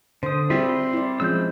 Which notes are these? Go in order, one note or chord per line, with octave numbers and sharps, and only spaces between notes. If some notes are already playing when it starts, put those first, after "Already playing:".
D3 C5 D#6
G3 C4 E4 F4 G#4 E5
C6
E4 D5
F3 G#3 C#4 E6 G6